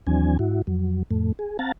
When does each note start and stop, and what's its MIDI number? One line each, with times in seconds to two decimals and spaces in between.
0.07 0.37 39
0.07 0.37 52
0.07 0.37 54
0.07 0.37 60
0.07 0.37 62
0.07 0.37 80
0.39 0.62 44
0.39 0.62 64
0.39 0.62 66
0.67 1.03 41
0.67 1.03 54
1.11 1.33 41
1.11 1.33 45
1.11 1.33 57
1.39 1.57 68
1.59 1.72 60
1.59 1.72 77
1.59 1.72 78
1.59 1.72 81
1.59 1.72 82
1.59 1.72 93